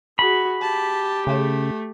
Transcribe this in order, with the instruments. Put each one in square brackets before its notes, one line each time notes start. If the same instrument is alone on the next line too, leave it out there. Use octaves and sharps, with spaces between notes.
[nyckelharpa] F#4 G#4 [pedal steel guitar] B5
[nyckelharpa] G4 [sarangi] A5
[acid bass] C#3 [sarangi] A3